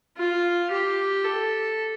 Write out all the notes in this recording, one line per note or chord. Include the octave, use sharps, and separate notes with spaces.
F4
G4
A4